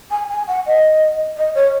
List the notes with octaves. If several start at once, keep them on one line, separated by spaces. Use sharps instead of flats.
G#5
G#5
F#5
D#5
D#5
C#5